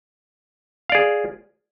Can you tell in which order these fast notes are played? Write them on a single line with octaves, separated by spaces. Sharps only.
F5 D5 G#4